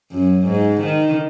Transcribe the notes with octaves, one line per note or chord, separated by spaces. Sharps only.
F#2
G#2
D#3